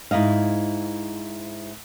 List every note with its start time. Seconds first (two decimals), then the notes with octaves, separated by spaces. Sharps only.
0.11 G#2 E4 D#5 F5